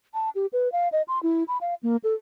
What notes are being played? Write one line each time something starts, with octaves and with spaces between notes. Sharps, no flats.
A5
G4
B4
F5
D#5
C6
E4
B5
F5
A#3
A4